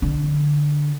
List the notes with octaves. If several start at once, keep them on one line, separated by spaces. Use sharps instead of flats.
D3